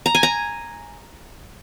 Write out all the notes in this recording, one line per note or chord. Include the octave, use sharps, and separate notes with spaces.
A#5
G#5
A#5